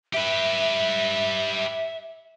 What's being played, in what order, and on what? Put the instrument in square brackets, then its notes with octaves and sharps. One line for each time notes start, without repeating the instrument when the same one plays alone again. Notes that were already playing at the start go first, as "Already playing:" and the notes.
[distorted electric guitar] G4 B4 [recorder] E5